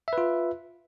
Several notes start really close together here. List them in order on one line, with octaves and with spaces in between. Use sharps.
E5 B4 F4